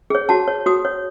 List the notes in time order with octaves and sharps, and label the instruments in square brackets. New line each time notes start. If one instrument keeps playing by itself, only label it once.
[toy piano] G#4 C#5
F#4 A5
C#5
F#4 D#6
C#5